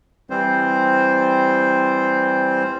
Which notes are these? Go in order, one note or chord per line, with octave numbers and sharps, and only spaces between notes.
E3 G3 C4 C5